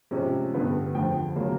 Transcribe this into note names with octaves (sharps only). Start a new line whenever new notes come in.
C3 F3 G#3 C#4
G2 D3 G3 B3
F2 D3 F3 G5
C#3 F#3 A#3